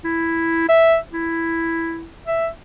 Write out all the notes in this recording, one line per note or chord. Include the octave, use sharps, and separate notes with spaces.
E4
E5
E4
E5